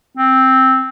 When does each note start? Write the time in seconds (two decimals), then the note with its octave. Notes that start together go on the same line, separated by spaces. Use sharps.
0.17 C4